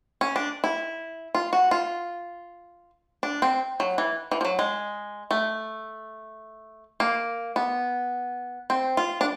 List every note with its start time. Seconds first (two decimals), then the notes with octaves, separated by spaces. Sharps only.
0.21 C#4
0.36 D4
0.64 E4
1.35 F4
1.53 F#4
1.71 F4
3.23 D4
3.42 C4
3.80 F#3
3.98 E3
4.31 E3
4.41 F3
4.45 F#3
4.59 G#3
5.31 A3
7.00 A#3
7.56 B3
8.70 C4
8.97 F4
9.21 D4